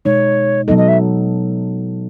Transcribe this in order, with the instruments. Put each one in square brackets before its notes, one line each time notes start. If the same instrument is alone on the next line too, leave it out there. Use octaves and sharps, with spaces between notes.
[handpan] B2 G#3 D#4 [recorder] C#5
[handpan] B2 F#3 B3 D#4 A4 [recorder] D#5
[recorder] D#5
E5